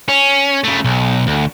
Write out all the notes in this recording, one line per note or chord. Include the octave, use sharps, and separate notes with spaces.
C#4
C#3 A3
B1
D2